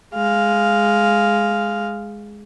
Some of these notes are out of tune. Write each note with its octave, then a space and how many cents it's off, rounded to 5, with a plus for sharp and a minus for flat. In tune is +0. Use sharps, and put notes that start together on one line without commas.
G#3 +0 F5 +0